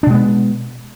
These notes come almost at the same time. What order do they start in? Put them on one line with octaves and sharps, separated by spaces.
D4 B2 G#3 B3